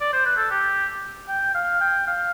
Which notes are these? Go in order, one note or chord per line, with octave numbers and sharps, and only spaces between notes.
D5
C5
B4
A4
G4
G5
F5
G5
F5